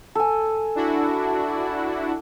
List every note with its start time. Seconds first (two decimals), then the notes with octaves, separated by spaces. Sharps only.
0.15 A4 G#5
0.75 D4 E4 F#4